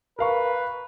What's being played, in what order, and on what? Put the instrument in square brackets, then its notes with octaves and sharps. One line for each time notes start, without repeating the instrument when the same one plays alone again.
[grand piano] A#4 F5 C#6 [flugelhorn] B4